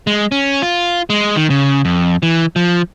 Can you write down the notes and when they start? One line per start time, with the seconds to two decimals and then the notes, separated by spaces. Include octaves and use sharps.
0.07 G#3
0.32 C#4
0.62 F4
1.10 G#3
1.36 D#3
1.50 C#3
1.85 F2
2.23 E3
2.56 F3